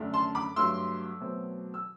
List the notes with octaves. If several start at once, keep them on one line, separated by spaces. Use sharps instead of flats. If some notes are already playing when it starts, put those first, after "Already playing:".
Already playing: F#2 D3 A3 D4
A5 C6
B5 D6
G2 F#3 A3 C6 E6
B2 F#3 A3 C4
E6